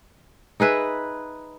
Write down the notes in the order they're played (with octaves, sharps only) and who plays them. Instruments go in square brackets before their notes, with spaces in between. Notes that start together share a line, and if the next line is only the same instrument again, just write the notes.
[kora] D#4 G#4 B4 E5